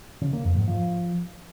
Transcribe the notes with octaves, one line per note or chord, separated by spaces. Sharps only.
C#3
A#3
F2
G#2
F3